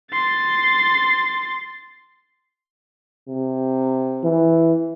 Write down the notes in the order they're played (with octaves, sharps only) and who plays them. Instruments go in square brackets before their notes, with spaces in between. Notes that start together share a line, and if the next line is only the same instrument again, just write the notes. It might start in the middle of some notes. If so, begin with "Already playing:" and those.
[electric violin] C6 A6
[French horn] C3
[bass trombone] E3